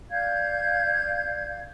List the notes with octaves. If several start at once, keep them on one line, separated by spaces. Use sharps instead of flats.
D5 F5 G6 G#6